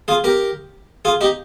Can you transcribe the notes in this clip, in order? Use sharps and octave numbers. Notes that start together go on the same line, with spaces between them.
F4 G#4
G4 A#4
F4 G#4
D#4 G4